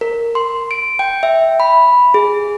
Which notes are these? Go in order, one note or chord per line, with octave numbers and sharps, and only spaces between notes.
A#4
C6
D7
G5
E5
B5
G#4